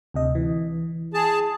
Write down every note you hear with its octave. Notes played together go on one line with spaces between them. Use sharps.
D2 C3 D#5
E3
G#4 A5